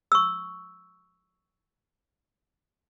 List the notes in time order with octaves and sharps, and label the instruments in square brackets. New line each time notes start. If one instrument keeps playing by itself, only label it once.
[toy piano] C#6 E6